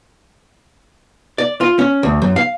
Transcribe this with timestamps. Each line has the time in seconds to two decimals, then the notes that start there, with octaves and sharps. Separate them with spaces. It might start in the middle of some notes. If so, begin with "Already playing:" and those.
1.38 D5
1.61 F4
1.79 C#4
2.03 D2
2.22 F#2
2.36 F5